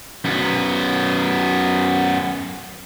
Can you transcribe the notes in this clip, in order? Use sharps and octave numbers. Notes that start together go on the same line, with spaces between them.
F#2 B3